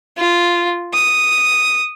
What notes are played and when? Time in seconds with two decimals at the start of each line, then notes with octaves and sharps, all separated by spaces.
0.17 F4
0.94 D#6